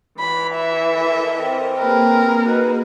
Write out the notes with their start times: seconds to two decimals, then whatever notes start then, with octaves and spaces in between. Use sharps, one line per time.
0.19 E3 B5
0.56 E5
0.90 A4 A#4 D#5
1.37 C4
1.78 A#3 G#4 A#4 B4
2.44 D#4 F#4 B4